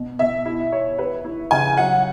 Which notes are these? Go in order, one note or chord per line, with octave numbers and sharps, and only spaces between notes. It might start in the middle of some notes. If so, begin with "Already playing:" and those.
Already playing: B2
B2 E5
E4
C#5
B4
E4
C#3 G#5
F#3 F#5